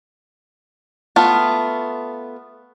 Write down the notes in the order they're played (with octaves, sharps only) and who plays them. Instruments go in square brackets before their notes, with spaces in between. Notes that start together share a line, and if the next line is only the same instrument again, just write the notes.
[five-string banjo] A3 B3 F4